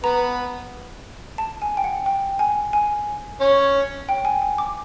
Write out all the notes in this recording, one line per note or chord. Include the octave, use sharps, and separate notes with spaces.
B3 B4 A#5
A5
G#5
G5
F#5
G5
G#5
G#5
C#4 C#5
G5
G#5
G#5
D6